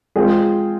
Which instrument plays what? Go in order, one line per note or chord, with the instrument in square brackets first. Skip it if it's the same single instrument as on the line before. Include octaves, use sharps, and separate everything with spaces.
[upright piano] G#3 C4 F4 G#4